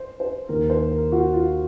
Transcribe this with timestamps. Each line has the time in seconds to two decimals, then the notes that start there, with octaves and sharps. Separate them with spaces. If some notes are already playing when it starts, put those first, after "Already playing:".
Already playing: C5
0.20 C5
0.49 D#2 D#3 A#3 A#4
0.70 C5
0.91 A#4
1.12 F#4
1.34 F4